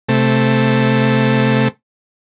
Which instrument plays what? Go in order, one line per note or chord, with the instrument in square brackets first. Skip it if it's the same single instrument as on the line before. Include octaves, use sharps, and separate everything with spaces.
[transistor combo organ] C3 A3